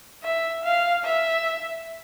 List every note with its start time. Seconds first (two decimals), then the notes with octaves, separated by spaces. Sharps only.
0.24 E5
0.64 F5
1.05 E5